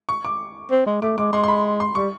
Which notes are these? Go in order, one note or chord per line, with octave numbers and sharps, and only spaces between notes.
C#6
D6
C4
G#3
A3 D6
G#3 D6
G#3 C6
C6
B5
C6
G3 C#6